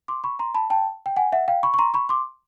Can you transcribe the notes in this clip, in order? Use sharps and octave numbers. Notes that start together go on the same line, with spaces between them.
C6 D6
B5 C#6
A#5 C6
A5 B5
G5 A5
G5
F#5 G#5
E5 F#5
F5 G5
B5 C#6
C#6
A#5 C6
B5 C#6
C6 D6